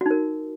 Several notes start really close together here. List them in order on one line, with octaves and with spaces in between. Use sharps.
F#4 D#4 A#4